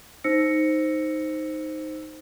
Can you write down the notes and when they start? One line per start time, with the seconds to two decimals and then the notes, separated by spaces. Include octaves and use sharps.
0.24 D#4 C5 E6 A#6 C#7